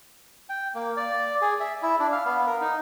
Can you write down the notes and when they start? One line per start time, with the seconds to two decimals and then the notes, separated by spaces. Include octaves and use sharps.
0.49 G5
0.75 A#3
0.97 D5
1.41 G#4
1.60 E5
1.82 E4
1.99 D4
2.12 F5
2.25 B3
2.47 A#4
2.61 D#4